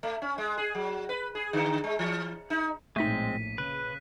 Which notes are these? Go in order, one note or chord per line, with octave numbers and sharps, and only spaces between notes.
A3
C#4
G#3
G#4
F#3
B4
G#4
D3
G#3
E3
D#4
A#1 A2 G#3 A3 C4 D#4 B6 D#7
C#3 B4 F#6